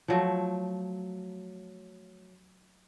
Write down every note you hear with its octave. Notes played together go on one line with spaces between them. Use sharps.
F3 F#3 A3